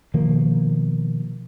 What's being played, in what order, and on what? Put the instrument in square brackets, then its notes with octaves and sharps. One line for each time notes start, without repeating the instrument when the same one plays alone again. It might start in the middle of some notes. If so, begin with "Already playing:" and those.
[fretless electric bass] B2 D#3 F3 A#3